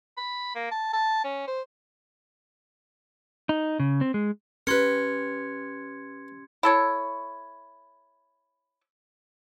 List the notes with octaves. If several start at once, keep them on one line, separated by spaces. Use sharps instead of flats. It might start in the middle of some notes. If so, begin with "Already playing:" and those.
B5
A#3
A5
A5
C#4
C5
D#4
C#3
C4
G#3
C#4 G4 A#4 B4 C6 G#6 C#7
E4 A4 C#5